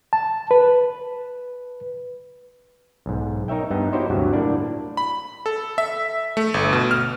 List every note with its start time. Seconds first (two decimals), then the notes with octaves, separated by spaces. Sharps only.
0.13 A5
0.51 B4
3.06 B1 G#2
3.48 D#4 A#4 C#5 E5 G5
3.71 G2 B3 D#4
3.92 E4 F#4 G4 C5 C#5 D#5
4.10 D2 G2 C3 F#3 F#4
4.33 A2 A#3 D4 D5
4.97 B5
5.46 A4
5.78 E5
6.37 A3
6.54 G1
6.73 B2
6.91 F6